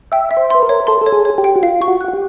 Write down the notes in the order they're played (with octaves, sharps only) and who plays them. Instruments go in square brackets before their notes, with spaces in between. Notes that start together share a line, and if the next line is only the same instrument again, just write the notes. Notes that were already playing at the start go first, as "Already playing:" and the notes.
[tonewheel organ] E5 [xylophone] G5
[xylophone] E5
[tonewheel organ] C5
[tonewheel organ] B4 [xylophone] C6
[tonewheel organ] A#4
[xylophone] C#5
[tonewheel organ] A4 [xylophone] C6
[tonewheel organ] A4 [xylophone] C#5
[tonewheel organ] G#4
[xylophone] C#5
[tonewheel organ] G4
[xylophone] G5
[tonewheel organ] F#4
[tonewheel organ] F4 [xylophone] F5
[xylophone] C#6
[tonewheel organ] F#4
[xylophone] F#6
[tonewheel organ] F#4
G4